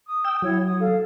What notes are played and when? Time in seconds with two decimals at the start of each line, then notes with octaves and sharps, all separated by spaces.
0.06 D#6
0.24 G5 E6
0.42 F#3 E4 C#5
0.66 D#6
0.79 A4 F5